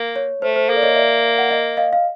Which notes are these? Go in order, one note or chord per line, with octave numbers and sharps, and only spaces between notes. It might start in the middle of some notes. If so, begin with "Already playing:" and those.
Already playing: A#3
C#5
A3 C5
C5
A#3 A4
D5
C#5 D#5
D5 E5
F#5
D#5 F5
D#5 F5
F5